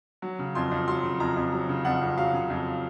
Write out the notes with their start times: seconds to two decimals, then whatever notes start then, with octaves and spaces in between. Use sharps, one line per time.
0.22 F#3
0.39 C#3
0.55 F2 C6
0.71 F2
0.88 F#3 C6
1.04 C#3
1.20 F2 A#5
1.36 F2
1.53 F#3
1.69 C#3
1.85 F2 F#5
2.01 F2
2.17 F#3 F5
2.34 C#3
2.50 F2